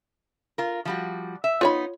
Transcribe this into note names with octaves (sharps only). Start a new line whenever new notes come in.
F4 A#4
F3 G3 F#4
E5
B3 D#4 F4 C#5 B5